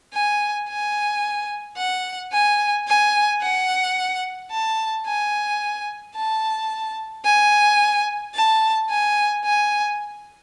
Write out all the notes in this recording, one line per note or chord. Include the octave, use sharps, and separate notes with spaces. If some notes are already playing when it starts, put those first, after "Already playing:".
G#5
G#5
F#5
G#5
G#5
F#5
A5
G#5
A5
G#5
A5
G#5
G#5